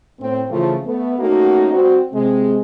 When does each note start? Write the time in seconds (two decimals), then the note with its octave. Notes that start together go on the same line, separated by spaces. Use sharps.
0.20 A2 C4
0.49 C#3 E3 F3 A3 F4
0.86 A3 B3
1.19 A3 A#3 C#4 D#4 F#4
1.71 G3 C4 F#4
2.12 C3 G#3 C4